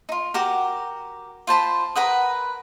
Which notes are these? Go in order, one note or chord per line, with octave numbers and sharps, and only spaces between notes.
D#4 F4
F#4 G4 A#4
F4 C5 A5 B5
A#4 B4 F#5 D#6